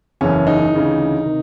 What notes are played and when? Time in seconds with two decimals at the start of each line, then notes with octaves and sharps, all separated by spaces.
0.21 F#1 E2 C#3 E3 C#4
0.47 D#4
0.73 D2 C#3 E3
1.26 C3 D#3